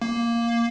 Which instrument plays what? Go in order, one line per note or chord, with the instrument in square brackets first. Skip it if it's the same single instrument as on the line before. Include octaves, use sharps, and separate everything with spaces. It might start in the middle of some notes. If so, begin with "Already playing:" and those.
[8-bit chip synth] A#3